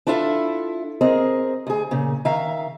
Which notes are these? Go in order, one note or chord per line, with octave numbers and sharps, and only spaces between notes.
D4 E4 F4 A4 C#5 E5
C4 G#4 A#4 D#5
D2 G#4
A#2 C#3
D#3 E5 F5 A#5